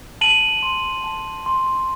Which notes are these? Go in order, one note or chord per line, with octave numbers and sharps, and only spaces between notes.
A5 D#7 F#7
C6
A5
C6